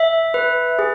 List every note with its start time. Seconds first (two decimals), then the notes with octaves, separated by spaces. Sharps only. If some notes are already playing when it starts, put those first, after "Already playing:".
Already playing: E5
0.34 B4
0.79 G#4